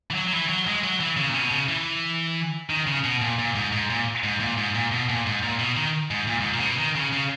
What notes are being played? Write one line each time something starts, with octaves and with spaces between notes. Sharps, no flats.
E3
F#3
F#3
E3
F#3
G#3
F#3
E3
C#3
A#2
B2
C#3
E3
D#3
C#3
B2
A#2
A#2
G#2
G#2
A#2
G#2
A#2
G#2
A#2
B2
A#2
G#2
A#2
B2
D#3
G#2
A#2
G#2
A#2
C#3
B2
D#3
C#3
C#3